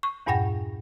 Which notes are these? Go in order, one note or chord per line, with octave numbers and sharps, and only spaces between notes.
C#6
E2 G2 A#2 F#5 G5 A#6